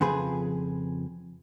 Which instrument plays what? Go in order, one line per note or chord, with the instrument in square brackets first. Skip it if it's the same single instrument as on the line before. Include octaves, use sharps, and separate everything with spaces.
[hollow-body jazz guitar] F2 C#3 F3 G#4 B4